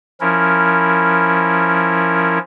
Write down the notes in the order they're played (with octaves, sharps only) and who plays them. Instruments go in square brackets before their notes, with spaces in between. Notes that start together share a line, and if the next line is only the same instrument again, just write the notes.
[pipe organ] F3 C#4 E4 A#4